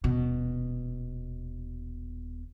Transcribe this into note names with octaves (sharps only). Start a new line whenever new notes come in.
D#1 B2